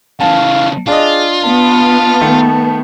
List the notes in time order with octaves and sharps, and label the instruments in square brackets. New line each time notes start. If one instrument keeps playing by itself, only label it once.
[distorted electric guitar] C#3 E3 [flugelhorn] F5 [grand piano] A5
[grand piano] D4 D#5 [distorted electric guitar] F4 [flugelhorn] G#4
[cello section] B3 [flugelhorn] A5
[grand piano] D#3 A3